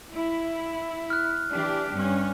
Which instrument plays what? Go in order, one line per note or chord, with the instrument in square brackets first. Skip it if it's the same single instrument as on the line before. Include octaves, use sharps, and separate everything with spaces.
[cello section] E4
[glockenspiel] F6 F#6
[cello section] E3 D4 G4
G2 C#4